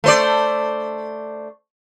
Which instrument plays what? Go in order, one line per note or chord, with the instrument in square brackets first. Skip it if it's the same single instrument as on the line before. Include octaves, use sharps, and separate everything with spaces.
[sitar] A3 C5 D5